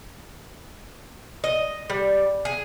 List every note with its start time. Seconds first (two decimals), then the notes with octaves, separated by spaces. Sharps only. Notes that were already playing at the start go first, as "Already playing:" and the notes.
1.44 D#5
1.90 G3
2.45 G#4